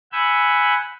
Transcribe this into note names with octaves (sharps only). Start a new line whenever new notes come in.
F#5 G#5 B5 E6 G6